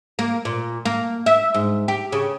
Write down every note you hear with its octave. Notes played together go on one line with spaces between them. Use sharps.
A#3
A#2
A#3
E5
G#2
G4
C#3